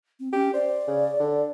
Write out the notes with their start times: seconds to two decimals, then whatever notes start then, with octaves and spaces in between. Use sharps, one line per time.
0.20 C4
0.32 C#4 G4
0.54 C5 D5
0.88 C#3
1.20 D3